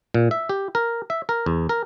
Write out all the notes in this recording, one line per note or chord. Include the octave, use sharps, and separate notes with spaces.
A#2
E5
G4
A#4
E5
A#4
E2
A#4